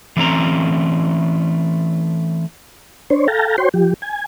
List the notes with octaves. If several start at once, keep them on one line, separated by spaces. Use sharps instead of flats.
E3 A3 C4 C#4 A#5
D4 C5 C#5
A4 F5 G5 A5 A#5
F#4 C5 C#5 G5 C6
F3 G4
G#5